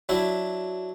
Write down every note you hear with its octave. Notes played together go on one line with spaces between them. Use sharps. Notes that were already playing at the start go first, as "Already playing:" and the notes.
F#3 D4 E4